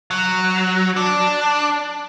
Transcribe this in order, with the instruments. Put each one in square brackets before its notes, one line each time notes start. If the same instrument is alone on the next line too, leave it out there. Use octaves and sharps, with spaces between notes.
[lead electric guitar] F#3
D4